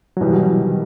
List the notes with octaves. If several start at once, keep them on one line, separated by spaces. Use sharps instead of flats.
F#3
C2 B2 E3 G3 D#4 G4
F#3
D#3